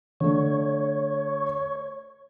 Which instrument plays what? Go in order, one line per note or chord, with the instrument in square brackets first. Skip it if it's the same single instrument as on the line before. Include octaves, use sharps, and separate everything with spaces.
[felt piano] D3 A3 [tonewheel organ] C#5